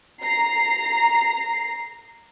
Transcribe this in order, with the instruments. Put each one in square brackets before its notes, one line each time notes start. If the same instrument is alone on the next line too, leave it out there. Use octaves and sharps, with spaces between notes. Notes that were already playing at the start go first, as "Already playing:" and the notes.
[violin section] A#5 C7